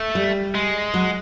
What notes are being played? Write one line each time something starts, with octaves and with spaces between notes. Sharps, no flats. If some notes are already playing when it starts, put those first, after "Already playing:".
Already playing: A3
G3
G#3
F#3